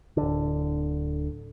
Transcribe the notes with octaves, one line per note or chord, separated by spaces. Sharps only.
D1 D3